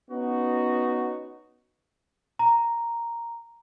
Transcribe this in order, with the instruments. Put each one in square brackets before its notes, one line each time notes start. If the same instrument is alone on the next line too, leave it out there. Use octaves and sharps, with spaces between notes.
[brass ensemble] B3 C#4 D#4 F#4
[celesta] A#5